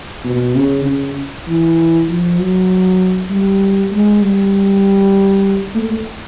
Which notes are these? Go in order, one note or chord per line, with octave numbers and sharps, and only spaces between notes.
B2
C#3
C#3
E3
F3
F#3
G3
G#3
G3
A3